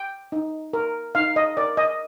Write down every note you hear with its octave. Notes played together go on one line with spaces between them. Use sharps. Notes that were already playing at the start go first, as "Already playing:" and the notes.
Already playing: G5
D#4
A#4
D#4 F5
D#5
A#4 D5
D#5